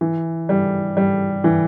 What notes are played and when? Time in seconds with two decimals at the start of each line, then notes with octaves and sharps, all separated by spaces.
0.01 E3
0.49 G3
0.97 G3
1.44 E3